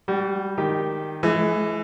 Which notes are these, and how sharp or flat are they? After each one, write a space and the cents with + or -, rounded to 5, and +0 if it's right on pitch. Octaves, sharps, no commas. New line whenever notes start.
G3 +0 F#4 +40
D#3 -5 G4 +0
E3 +20 G#3 +45